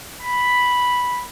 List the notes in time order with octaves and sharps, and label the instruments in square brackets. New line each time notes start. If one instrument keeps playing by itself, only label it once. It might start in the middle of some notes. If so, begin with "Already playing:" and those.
[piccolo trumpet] B5